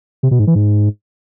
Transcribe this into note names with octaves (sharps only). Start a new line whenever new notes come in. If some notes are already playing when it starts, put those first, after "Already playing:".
C3
B2
G#2
E3
G#2